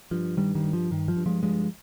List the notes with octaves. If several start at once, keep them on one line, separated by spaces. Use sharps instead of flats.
G2 F3
G2 D#3 G3
D#3 G3
G2
F3
G2 D#3
F3
G2
F3 G#3
G2 F3 G#3